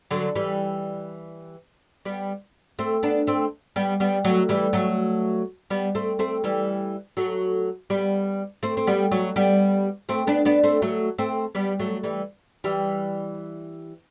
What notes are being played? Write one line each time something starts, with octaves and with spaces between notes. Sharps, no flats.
D3 F#3
E3 G3
G3 B3
A3 C4
B3 D4
A3 C4
G3 B3
G3 B3
F#3 A3
E3 G3
F#3 A3
G3 B3
A3 C4
A3 C4
E3 G3
F#3 A3
G3 B3
A3 C4
C4
G3 B3
F#3 A3
G3 B3
A3 C4
B3 D4
B3 D4
A3 C4
F#3 A3
A3 C4
G3 B3
F#3 A3
E3 G3
E3 G3